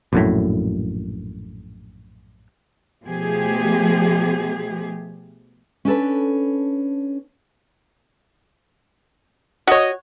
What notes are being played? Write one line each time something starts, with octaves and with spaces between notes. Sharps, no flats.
A#1 F#2 A2
B2 F3 A3 G4 G#4
C#4 D4 A4 B4
F#4 C#5 D#5